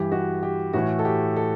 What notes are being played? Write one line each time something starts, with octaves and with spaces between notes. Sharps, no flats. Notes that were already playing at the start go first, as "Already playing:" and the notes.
Already playing: G2 E3 G4
F#4
G4
A2 E3 F#4
A4
G4
A4